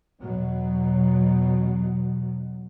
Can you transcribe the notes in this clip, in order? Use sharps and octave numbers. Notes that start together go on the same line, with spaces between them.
E2 B2 F#3